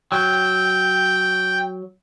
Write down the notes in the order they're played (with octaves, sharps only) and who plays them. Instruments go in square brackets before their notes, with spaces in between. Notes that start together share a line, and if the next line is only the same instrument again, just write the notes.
[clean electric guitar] F#3 [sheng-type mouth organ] G5